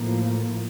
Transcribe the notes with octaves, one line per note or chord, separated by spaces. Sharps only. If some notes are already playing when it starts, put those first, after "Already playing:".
Already playing: A2 F3 A#3